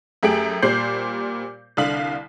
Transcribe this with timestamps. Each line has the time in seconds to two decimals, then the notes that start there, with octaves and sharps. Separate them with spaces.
0.23 F#2 A3 G4 G#4 D7 F#7
0.62 A#2 G3 C5 G6 C7 F#7
1.77 C2 D3 F5 B6 F#7